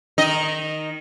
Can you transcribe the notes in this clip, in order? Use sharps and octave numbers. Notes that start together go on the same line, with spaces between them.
D#3 D#4 D#5